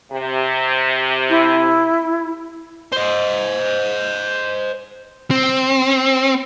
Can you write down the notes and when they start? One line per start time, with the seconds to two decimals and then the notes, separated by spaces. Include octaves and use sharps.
0.11 C3
1.30 E4
2.92 C5 D#5
5.31 C4